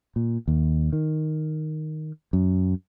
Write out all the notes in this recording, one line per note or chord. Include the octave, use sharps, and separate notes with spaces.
A#2
D#2
D#3
F#2